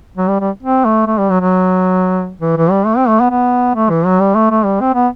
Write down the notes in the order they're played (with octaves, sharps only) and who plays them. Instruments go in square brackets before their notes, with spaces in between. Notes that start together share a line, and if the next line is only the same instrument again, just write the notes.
[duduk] F#3
G3
G3
C4
A3
A3
G3
F#3
F#3
E3
E3
G3
A3
C4
A3
B3
B3
A3
E3
F#3
G3
A3
A3
G3
C4
B3